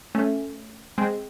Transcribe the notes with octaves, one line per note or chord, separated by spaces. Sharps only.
A3 C#4
G#3 C4